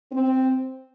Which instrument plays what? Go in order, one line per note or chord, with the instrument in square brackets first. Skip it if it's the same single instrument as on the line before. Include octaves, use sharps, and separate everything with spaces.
[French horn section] C4